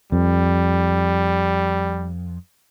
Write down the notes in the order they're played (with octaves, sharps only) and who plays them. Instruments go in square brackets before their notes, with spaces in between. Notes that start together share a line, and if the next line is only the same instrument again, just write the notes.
[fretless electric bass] F2 [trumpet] G3